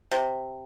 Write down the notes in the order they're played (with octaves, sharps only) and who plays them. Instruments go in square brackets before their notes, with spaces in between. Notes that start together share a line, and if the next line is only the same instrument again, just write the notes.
[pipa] C3